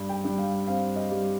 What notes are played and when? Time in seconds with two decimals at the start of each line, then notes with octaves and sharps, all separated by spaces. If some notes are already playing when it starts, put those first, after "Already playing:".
Already playing: G2
0.09 G5
0.24 G2
0.38 F5
0.67 C4 F5
0.96 D#5
1.11 G3